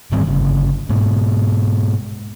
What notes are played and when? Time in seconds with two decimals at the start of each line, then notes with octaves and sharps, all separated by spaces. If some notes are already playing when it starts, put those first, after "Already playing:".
0.12 G#2 D#3 G3 C4
0.27 G1 C#3
0.89 G#2 B2